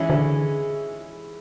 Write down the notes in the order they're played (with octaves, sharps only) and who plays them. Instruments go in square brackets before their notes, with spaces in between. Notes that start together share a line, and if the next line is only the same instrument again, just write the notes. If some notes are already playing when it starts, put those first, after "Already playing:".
Already playing: [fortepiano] E3 G#3 C#4 E4 G#4
[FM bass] D3